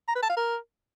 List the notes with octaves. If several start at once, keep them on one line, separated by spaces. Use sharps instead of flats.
A#5
B4
A5
F5
A#4